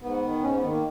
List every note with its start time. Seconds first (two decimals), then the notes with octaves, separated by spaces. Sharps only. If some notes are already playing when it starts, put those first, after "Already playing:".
0.01 G#2 B3
0.22 D#3
0.42 G#2 C#4
0.55 B3
0.62 D#3
0.69 A#3